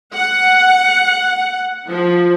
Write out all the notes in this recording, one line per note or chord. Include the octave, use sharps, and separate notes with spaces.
F#5
F3